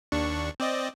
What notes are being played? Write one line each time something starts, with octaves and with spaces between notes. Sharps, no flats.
D#2 D4 C#6
C4 D5 D#5